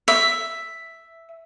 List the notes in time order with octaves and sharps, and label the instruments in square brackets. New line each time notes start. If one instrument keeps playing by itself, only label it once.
[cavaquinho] E5